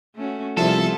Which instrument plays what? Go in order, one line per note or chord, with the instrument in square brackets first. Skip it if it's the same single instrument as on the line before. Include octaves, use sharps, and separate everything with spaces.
[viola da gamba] A3 C#4 F#4
[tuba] C2 [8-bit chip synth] F3 F4 E5 [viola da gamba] B3 G#4 [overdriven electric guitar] A4